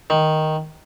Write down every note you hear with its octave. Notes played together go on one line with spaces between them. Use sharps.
D#3